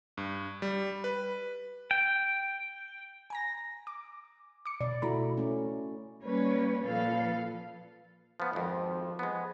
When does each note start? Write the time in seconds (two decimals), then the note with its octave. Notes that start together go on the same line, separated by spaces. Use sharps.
0.17 G2
0.62 G3
1.04 B4
1.91 G5
3.30 G#5 A#5 A#6
3.87 D6
4.66 D6 C#7
4.81 B2 D5
5.02 B2 A3 E4 F#4 A#5 B5
5.37 A3 C#4
6.24 G3 A#3 C#4 B4 C#5
6.83 A#2 F3 A4 B4 F5
8.40 F3 B3
8.53 G#1 F2 F3
9.19 G#3 B3